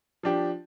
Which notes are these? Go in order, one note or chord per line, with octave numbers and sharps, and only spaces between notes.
F3 D4 G4